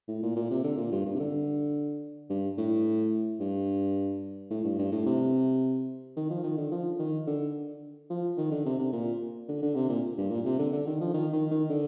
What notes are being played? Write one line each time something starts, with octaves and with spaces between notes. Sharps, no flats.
A2
A#2
A#2
C3
D3
A#2
G2
G2
C3
D3
G2
A2
G2
A2
G2
G2
A2
C3
D#3
F3
D#3
D3
F3
D#3
D3
F3
D#3
D3
C3
C3
A#2
D3
D3
C3
A#2
G2
A#2
C3
D3
D3
D#3
F3
D#3
D#3
D#3
D3